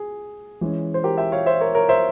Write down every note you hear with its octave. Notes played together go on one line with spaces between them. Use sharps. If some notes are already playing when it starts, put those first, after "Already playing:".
Already playing: G#4
E3 G#3 C#4
C5
G4 A#4
E5 G5
C#5 F5
C5 E5
A#4 C#5
A#4 C#5
C5 E5